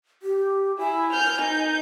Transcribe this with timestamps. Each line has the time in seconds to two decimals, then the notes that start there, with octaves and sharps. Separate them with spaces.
0.22 G4
0.78 E4 G#5
1.11 F6 G6
1.40 D#4 G6